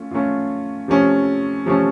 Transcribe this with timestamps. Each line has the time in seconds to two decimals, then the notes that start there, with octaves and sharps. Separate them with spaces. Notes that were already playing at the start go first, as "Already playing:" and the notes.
Already playing: A3 C#4 F4
0.11 A3 C#4 F4
0.88 C3 F3 A3 C#4
1.66 C3 F3 A3 C#4